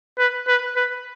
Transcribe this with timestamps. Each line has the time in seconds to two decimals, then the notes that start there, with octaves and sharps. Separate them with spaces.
0.18 B4
0.47 B4
0.76 B4